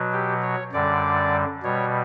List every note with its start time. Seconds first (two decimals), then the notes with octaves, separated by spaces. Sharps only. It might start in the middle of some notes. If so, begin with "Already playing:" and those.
Already playing: B2 F#3
0.13 G4
0.42 C#5
0.73 F#2 D3 G3 D5
1.63 B2 G3 C#5